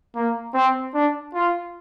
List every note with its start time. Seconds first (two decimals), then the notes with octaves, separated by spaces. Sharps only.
0.15 A#3
0.54 C4
0.94 D4
1.34 F4